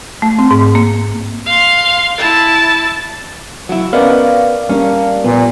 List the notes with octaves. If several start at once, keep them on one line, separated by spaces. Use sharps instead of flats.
A3
C4
G#2
A#3
F5 C6
E4 A5
F#3 E4
B3 C#4 A#4 D5 D#5 F5
G3 A#3 C#4 D4 A#4 F5
A#2 F3 B3